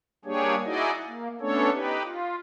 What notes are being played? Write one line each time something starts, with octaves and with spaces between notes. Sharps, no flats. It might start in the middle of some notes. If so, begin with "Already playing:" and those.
G3 A#3 D4 G4 G#4 C#5
D#4 E4 F#4 G#4 D5 D#5
A#3
A3 B3 C#4 D4 A4 C#5
D#4 G4 B4
F4